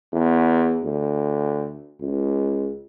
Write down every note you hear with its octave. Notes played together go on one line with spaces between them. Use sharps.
E2
D2
C#2